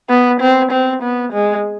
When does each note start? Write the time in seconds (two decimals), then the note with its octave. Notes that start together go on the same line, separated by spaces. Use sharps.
0.10 B3
0.41 C4
0.72 C4
1.03 B3
1.33 G#3